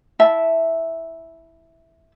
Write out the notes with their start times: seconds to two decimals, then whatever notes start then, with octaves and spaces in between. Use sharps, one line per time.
0.19 E4 E5 A5